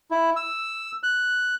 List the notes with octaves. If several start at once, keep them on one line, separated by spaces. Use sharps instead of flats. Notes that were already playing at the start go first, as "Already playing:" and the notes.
E4
E6
F#6